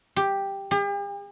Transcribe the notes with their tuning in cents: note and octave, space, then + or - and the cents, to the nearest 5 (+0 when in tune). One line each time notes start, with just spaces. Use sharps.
G4 +5
G4 +45